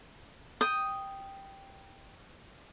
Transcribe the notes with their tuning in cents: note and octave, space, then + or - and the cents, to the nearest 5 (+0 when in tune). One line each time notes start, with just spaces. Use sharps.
G5 +0 D#6 +0